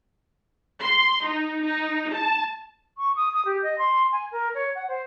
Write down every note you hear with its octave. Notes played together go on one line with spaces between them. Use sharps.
C6
D#4
D#4
A5
C#6
D#6
D#6
G4
D#5
C6
G#5
A#4
C#5
F#5
C5